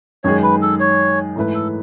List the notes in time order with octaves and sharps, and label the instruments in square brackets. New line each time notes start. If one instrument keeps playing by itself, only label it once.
[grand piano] F#2 D#3 G#3 D#4 G#4 [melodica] C#5
[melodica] B4
A4
C#5
[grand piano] G#2 E3 A3 E4 B4
[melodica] A4